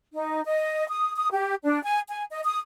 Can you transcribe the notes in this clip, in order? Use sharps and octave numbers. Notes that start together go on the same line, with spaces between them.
D#4
D#5
D#6
D#6
G4
D4
G#5
G#5
D#5
D#6